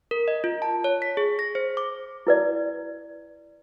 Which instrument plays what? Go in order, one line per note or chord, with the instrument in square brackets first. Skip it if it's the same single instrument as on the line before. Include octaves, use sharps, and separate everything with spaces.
[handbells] A#4
D#5
F4
A5
C#5
B6
G#4
A#6
C5
D6
[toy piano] E4 B4 D5